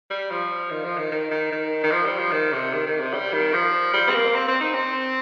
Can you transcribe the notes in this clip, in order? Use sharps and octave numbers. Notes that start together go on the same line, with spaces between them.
G3
F3
D#3
F3
D#3
D#3
D#3
D#3
D#3
F3
G3
F3
D#3
C3
D#3
D#3
C3
G3
D#3
F3
G3
C4
A#3
C4
C4
D#4
C4